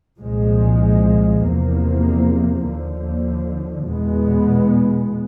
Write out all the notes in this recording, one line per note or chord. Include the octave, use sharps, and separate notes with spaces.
C2 A#2 F3 G#3
E2 C3 F3 A#3
D#2 D3 F3
E2 B2 G#3 B3